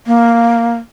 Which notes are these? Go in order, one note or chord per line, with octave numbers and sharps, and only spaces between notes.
A#3